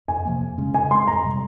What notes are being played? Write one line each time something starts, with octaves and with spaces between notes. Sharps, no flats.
F2 G#5
C3 F3 A#3
F2
C#3 G#3 C#4
C#3 G#5
G#3 C4 C6
F2 A#5
C3 G3